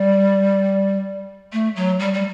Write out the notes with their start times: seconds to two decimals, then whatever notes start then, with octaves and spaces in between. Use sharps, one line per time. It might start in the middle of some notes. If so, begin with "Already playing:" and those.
Already playing: G3
1.52 A3
1.76 F#3
1.99 G3
2.14 G3